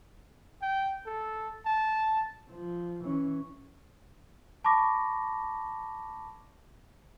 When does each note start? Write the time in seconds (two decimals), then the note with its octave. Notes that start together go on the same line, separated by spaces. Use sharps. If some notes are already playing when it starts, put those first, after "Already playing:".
0.62 G5
1.06 A4
1.66 A5
2.51 F3
3.04 E3 C#4
4.64 A5 B5 C#6 D6 A#6